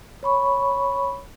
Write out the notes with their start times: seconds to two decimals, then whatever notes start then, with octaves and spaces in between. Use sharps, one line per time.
0.23 C#5 B5 C#6